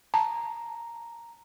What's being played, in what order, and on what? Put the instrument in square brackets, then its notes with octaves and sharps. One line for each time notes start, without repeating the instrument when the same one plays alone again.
[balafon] A5 [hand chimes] A#5